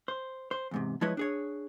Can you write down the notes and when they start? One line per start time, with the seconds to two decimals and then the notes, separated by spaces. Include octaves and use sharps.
0.08 C5
0.51 C5
0.71 E2 G#2 C3
1.01 F3 G#3 E4 B4 C#5 D#5
1.17 D4 G#4 C#5